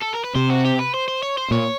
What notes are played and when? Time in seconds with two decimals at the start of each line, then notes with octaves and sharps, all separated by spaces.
0.02 A4
0.14 A#4
0.24 B4
0.36 C3 C5
0.50 F#4
0.65 G4
0.79 B4
0.94 C5
1.08 C5
1.23 C#5
1.37 C5
1.51 A#2 C#5